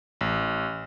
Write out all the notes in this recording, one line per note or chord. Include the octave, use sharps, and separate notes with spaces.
A1